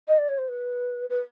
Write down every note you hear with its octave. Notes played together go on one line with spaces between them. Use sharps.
D#5
D5
C#5
C5
B4
B4